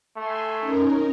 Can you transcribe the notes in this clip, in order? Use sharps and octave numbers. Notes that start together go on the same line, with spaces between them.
A3 G#5 C6
C#4 D#4 A#4